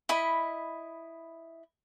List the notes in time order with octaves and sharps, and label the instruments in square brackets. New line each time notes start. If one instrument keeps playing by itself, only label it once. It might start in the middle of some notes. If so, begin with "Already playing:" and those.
[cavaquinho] E4 D#5 B5